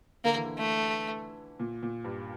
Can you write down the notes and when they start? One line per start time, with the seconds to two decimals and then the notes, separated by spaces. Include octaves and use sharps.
0.24 D3 A#3
0.35 E3
0.45 D3
0.58 A3
1.60 A#2
1.83 A#2
2.04 G2